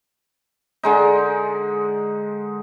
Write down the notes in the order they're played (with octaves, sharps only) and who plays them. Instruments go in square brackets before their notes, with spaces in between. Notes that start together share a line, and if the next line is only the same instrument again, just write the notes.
[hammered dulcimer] D3 G#3 D#4